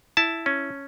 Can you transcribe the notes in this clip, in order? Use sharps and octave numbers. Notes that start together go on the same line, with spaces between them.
E4 A5
C#4